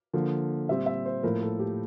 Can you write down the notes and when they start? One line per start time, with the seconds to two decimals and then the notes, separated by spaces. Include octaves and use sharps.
0.13 D3 F3 A#3
0.69 A#2 G3 C4 E5
0.86 E5
1.05 C5
1.23 A2 F3 A#3 A#4
1.42 A4
1.59 G4